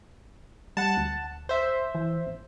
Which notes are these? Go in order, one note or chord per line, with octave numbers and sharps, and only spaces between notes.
G3 F#5 A5
D2
C5 E5
E3
G#1